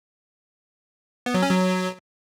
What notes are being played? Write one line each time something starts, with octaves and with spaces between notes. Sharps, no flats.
B3
F#3
C#4
F#3